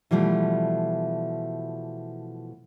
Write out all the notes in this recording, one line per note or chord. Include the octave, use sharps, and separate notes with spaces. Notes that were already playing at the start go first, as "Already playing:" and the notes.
B2 E3 F3 G3 A3